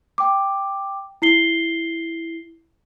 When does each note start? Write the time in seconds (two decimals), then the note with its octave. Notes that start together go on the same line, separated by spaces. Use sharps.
0.18 G5 D6
1.22 E4 C7 G7